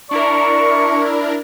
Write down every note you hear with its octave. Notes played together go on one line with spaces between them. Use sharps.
D4 E4 A#4 D5 C#6